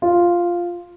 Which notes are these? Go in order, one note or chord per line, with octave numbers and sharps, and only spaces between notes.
F4